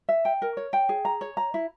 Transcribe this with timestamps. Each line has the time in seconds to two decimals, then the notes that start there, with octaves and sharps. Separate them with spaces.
0.09 E5
0.25 G5
0.42 A#4
0.57 C#5
0.73 G5
0.89 G#4
1.05 A#5
1.21 C#5
1.37 A#5
1.54 E4